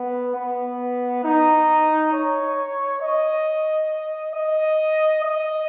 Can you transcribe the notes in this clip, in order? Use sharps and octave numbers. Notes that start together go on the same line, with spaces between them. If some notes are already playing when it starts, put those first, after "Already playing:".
Already playing: B3
B3
D#4
C#5
D#5
D#5
D#5